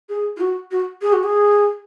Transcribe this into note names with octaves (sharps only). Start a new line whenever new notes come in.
G#4
F4
F#4
F#4
G#4
F#4
G#4